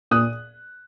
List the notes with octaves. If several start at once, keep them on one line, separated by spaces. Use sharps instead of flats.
A#2 D#6 F#6